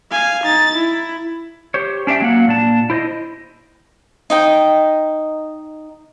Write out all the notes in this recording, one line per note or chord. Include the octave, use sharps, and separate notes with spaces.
F5 G#5
D#4 A6
E4
G4 C5 C#5
C#4 D4 G4 E5 G5
F#3 A#3 F5 F#5
A#2 D4 A5
E4 C5 D5 D#5
D#4 D#5 G5